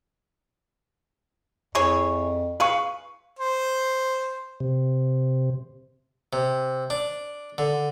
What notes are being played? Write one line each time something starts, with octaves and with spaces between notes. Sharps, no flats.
F2 E3 G#4 C#5
G#4 B4 F5 C#6
C5
C3
C3
D4
D3